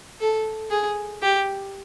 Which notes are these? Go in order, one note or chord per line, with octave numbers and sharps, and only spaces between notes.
A4
G#4
G4